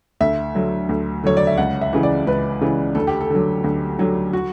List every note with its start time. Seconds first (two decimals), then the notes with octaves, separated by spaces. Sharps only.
0.21 D2 E5
0.55 D3 F#3
0.89 D2
1.24 D3 F#3 C#5
1.37 D5
1.47 E5
1.58 C#2 F#5
1.81 E5
1.93 C#3 E3
2.03 D5
2.27 C#2 B4
2.61 C#3 E3
2.95 D2 A4
3.07 G4
3.21 A4
3.30 D3 F#3
3.64 D2
3.99 D3 F#3
4.33 F#4